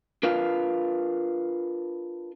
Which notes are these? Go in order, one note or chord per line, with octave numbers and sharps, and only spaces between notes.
D4 F4 A#4 B4 F5